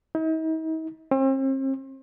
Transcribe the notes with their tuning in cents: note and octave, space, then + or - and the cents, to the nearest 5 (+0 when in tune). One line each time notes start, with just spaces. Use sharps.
D#4 +45
C4 +40